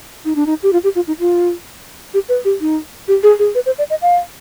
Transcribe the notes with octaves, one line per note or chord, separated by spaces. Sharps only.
D#4
D4
D#4
G4
F4
G4
F4
D#4
F4
G4
B4
G4
D#4
G4
G#4
G#4
B4
C5
D5
D#5
F5